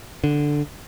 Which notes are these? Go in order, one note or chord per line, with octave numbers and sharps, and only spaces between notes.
D3